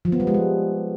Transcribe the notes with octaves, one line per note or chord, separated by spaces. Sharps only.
F3
B3
G3
G#3
G3